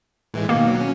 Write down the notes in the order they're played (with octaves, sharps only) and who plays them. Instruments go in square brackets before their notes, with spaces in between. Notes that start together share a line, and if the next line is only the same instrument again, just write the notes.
[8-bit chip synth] A2 E3 G#3
[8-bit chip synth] B2 D#3 [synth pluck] A#3
[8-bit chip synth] B2 F#3
C#4